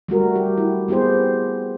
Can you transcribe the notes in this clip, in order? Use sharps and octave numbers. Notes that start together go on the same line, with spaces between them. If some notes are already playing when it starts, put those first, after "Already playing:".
G3 A3 F#4 A#4
G4
E4
B3 E4 G4 G#4 C5